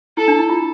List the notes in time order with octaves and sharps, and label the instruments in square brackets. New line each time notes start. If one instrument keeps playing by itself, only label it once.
[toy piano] E4 [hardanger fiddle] A4
[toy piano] D4
E4
F4